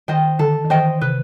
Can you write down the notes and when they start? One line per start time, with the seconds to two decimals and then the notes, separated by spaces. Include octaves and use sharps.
0.08 D#3 C5 D#5 G5
0.39 D3 A4
0.65 D#3
0.70 E3 C5 D#5 G5
1.01 C3 B4